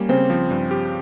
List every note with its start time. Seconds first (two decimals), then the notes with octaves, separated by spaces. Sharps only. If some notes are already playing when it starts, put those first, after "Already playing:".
Already playing: G3 A#3 C#4
0.09 C#3 C4
0.30 F3
0.51 G2
0.71 G4